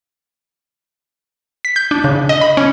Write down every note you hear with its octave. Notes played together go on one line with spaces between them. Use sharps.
B6
G6
D4
C#3
D#5
B5
C#4